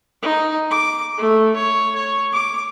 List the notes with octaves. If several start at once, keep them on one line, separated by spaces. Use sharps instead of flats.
D#4
D6
A3
C#5
C#5
D6